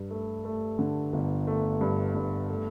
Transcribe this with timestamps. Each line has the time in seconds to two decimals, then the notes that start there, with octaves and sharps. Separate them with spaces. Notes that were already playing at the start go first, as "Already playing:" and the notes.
Already playing: G2
0.11 A3
0.45 A3
0.79 D3
1.13 G1
1.47 A3
1.81 G2
2.15 G2
2.50 A3